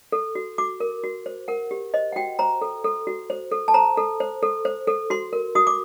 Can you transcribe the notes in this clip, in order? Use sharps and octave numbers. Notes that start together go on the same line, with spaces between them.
A4
F#4
F#4 D6
A#4
F#4
C5
A#4 F#5
G4
C5 D#5
F#5
F#4 G5
C5 A#5
A4
A4
F#4
C5
A4
A5
C5 A#5
A4
C5
A4
C5
A4
F#4 C6
A#4
F#4 D#6
D6